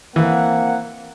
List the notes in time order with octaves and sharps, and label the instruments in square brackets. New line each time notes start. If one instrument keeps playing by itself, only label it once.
[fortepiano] E3 [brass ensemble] A#3 C4 F#5